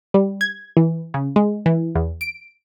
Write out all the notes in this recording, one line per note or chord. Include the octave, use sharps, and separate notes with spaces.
G3
G#6
E3
C#3
G#3
E3
E2
D7